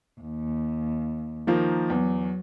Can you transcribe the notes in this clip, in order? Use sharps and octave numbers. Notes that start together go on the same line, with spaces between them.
D#2
D#3 F3 A#3
E2 F#3